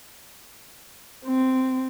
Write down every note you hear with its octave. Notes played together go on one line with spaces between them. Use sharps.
C4